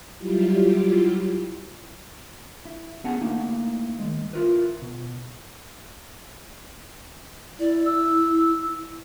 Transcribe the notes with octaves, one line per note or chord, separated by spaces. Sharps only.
F#3 G3 E4 F4 G4
E4
B3 C#4 G#4 F#5 G#5 A5
A3 A#3 D#4 E4
D#3 G#3
E4 F4 A#4 B4
B2
E4 D5
E6